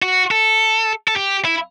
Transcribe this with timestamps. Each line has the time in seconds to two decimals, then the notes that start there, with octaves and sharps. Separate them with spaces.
0.02 F#4
0.31 A4
1.08 A4
1.16 G4
1.45 E4